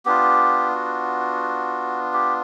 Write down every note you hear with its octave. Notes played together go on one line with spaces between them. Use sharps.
B3 D4 F4 G4
F#4
G4